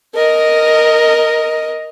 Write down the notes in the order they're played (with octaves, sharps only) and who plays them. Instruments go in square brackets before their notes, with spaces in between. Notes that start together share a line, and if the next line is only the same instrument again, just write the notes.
[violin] A#4 D#5